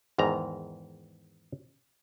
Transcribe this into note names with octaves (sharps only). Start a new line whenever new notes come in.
E2 G#2 D#3 A#5